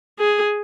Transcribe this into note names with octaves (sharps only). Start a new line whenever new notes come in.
G#4